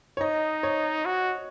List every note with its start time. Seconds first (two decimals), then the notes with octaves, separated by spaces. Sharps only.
0.17 C#5
0.21 D#4 D#5
0.63 C#5
1.05 F#4